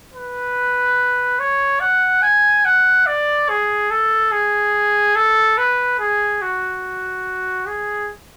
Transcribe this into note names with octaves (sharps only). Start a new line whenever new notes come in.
B4
C#5
F#5
G#5
F#5
D5
G#4
A4
G#4
A4
B4
G#4
F#4
G#4